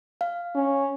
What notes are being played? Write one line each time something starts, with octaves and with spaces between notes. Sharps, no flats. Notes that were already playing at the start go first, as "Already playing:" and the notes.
F5
C#4